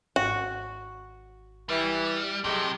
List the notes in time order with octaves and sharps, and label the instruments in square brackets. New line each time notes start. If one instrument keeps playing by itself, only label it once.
[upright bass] G#1 [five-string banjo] F#4
[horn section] E3 [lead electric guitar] G3
[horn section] A2 G#3 G4 [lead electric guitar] C3 [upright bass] F#3